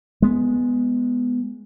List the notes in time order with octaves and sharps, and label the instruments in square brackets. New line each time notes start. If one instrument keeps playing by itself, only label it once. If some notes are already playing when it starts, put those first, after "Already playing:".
[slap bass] G#3 B3